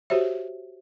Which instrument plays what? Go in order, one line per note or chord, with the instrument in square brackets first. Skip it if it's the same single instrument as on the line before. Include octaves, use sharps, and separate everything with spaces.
[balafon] F#4 G4 C5 C#5 E5